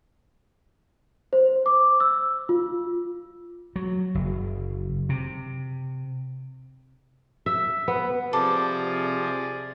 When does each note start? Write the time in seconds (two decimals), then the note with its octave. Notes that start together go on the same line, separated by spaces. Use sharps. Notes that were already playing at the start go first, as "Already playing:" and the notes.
1.33 C5
1.66 D6
2.00 E6
2.49 F4
3.76 F#3
4.15 F#1
5.09 C3
7.46 E5
7.88 B3
8.33 C3 F3 G#4 A4 D5 D6